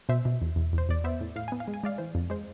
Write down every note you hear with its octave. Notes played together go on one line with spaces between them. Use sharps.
B2 C5 E5
B2
E2
E2
E2 C5
E2 D5
B3 C5 E5
A2
A2 F5
B3 G#5
F5
G#3
G#5
G#3 D5 F5
E3 C5
F2
G#3 C5